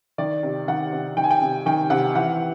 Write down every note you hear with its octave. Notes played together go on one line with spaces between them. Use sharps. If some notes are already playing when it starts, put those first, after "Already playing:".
D#3 D5
C3
D#3 F#5
C3
D#3 G5
G#5
G5
C3
D#3 G5
C3 F#5
E3 F#5